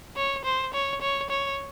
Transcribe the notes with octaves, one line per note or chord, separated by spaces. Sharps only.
C#5
C5
C#5
C#5
C#5